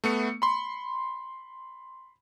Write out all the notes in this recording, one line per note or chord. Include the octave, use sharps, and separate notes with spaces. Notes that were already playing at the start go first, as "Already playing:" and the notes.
A3 B3 C#7
B5 C6